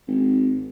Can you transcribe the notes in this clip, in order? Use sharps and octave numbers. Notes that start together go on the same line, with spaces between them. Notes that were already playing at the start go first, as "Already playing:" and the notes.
G#1